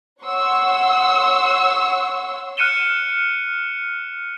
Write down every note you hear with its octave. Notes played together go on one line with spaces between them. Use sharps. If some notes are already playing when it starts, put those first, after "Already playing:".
C#5 F#5 C6 C#6 E6
F6 F#6 C#7 D#7 E7 G7